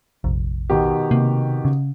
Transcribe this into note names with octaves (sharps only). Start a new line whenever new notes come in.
F1 A#1
B2 D#3 G4
C3 A#3
C#3